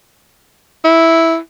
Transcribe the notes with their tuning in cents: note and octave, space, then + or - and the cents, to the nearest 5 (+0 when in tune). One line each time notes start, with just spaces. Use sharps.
E4 -5